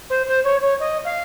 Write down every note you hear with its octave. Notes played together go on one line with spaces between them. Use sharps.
C5
C5
C#5
C#5
D#5
F5